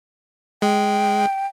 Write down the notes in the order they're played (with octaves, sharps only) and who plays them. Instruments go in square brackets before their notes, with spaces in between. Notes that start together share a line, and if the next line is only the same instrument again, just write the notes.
[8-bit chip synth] G#3 [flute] G5